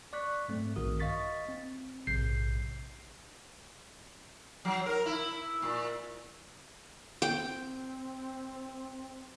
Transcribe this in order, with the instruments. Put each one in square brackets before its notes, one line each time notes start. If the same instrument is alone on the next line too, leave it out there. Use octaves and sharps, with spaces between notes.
[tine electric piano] D5 C#6 F#6 B6
G#2 F#3 A3 C4
A#1 G2 D#3 F#4 A#4 D#6
D#5 F5 C#6 A6 B6
C4
A#1 G#2 C3 G6 C7
[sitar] F#3
A#4
E4
A#2
[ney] C4 [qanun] G5